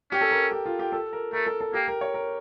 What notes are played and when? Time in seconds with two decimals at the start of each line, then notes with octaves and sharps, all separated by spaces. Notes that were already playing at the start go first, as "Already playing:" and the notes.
0.11 C#4 G4
0.21 A4
0.31 A#4
0.52 G4
0.66 F4
0.79 G4
0.92 A4
1.13 A#4
1.33 A3 A#4
1.47 A4
1.61 A4
1.74 A#3 G4
1.88 A#4
2.01 C#5
2.14 A#4